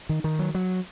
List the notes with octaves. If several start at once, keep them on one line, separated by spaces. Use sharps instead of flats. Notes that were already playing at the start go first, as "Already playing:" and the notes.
D#3
D#3
F#3
F#3